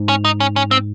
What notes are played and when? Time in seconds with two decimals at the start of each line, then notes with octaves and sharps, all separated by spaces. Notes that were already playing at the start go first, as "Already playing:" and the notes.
Already playing: G#2
0.09 C#4
0.25 D#4
0.40 C#4
0.56 C#4
0.71 C4